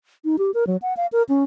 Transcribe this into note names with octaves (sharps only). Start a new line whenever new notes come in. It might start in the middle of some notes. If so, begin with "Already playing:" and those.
D#4
G4
A#4
F#3
F#5
F5
A#4
C#4